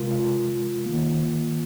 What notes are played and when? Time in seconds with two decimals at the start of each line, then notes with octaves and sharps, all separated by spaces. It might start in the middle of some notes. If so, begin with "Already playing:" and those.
Already playing: C3 G#3 F4 A#4
0.86 D#3 A#3